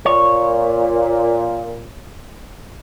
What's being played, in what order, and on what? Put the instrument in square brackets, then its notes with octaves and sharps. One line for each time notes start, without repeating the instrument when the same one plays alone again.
[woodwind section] A#2 [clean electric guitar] C#5